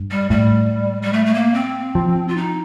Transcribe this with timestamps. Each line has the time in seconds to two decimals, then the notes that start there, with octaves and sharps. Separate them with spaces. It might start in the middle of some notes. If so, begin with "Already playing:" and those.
Already playing: G2
0.11 G3
0.30 A2 G3
1.02 G3
1.13 A3
1.26 A3
1.34 A#3
1.54 C4
1.95 F3
2.28 F4
2.37 D#4